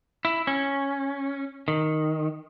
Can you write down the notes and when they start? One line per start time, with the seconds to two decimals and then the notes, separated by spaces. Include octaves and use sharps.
0.25 E4
0.47 C#4
1.68 D#3